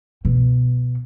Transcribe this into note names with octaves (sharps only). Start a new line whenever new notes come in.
B2